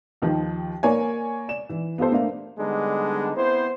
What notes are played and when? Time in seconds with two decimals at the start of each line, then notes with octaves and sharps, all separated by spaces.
0.22 D#2 D#3 F3
0.83 A#3 A#4 C#5 D5 G#5
1.48 D5 E7
1.69 E3
1.98 B3 F4 G4 A4 C5
2.12 A3 A#3 D4 F5
2.58 D3 G3 G#3 B3 D4 D#4
3.36 B3 C4 E4 C5